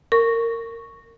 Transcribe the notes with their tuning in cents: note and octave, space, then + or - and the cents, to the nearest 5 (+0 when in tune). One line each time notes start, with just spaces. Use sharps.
A#4 -20 C#6 +0